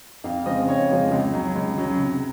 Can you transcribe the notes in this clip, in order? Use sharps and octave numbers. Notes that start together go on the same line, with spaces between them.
F2 F5
C#3 F3 G#3 C4 D#5
F2 C#5
C#3 F3 G#3 C4
C#2
C#3 F#3 C#4
C#2
C#3 F#3 C#4
C3